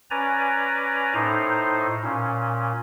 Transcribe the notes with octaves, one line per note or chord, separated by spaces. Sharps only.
C#4 B4 D5 G#5 A#5
A2 D#4 C5
A#2 C#4